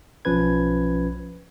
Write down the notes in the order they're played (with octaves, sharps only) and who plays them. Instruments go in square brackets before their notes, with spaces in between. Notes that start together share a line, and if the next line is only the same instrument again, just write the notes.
[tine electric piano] B1 F3 C#4 B4 G#6